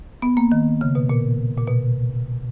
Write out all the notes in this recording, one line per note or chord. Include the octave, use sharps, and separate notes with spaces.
B3
A#3
D#3
C#3
B2
A#2
A#2
B2